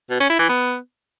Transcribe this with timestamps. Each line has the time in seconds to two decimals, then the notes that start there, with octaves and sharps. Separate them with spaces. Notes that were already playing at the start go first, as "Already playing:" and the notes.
0.10 B2
0.20 C#4
0.30 E4
0.39 E3
0.49 B3